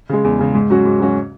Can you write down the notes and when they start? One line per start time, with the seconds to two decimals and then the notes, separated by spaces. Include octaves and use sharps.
0.09 C#3 G#3
0.24 E2
0.39 C#3 G#3
0.54 G#2
0.70 F#3 C#4 F#4
0.85 G#2
1.00 F#3 C#4 F#4